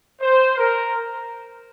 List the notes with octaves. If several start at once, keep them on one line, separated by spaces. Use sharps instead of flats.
C5
A#4